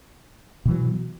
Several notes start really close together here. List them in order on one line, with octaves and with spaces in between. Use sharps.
B2 E3 F#3